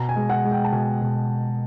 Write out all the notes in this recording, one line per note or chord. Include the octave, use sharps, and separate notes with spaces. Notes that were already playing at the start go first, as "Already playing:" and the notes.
Already playing: B2 A#5
G#5
G#3
F#5
G#3
G5
A5
B2 G#5
B2